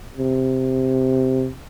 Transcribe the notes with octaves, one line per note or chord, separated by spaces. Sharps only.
C3